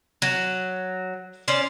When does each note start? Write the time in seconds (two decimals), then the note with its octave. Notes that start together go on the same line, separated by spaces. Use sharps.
0.22 F#3
1.48 C#4 C5 D5